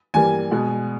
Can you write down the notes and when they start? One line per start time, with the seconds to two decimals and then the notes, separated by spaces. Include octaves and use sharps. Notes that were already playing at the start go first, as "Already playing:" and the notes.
0.14 G2 E3 G3 A#3 G#5
0.51 B2 G#3 B3